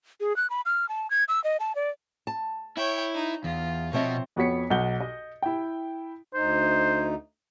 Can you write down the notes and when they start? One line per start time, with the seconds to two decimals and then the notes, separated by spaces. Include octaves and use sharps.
0.20 G#4
0.36 F#6
0.50 B5
0.66 F6
0.89 A5
1.11 G#6
1.28 E6
1.44 D#5
1.60 A5
1.75 D5
2.27 A5
2.77 E4 C#5 G5
3.14 D#4
3.44 E2 F4
3.93 B2 F3 C4 C#5 D#5 E5
4.36 F2 B3 F#4 C#5 B6 C#7
4.70 B1 F#5 G6 G7
5.00 D#5
5.42 E4 G5
6.34 D2 D#4 C5